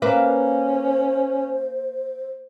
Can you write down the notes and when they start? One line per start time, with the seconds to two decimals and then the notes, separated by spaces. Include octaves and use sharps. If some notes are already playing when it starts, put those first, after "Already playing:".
0.02 A#3 C#4 B4 C5 E5